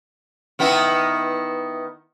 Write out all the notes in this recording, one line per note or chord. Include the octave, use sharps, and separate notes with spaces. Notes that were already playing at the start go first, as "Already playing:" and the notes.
D#3 B3 E4